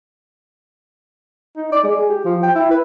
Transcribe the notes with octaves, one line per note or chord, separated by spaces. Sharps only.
D#4
D5
G#3
G#4
G4
F3
G5
E4
B4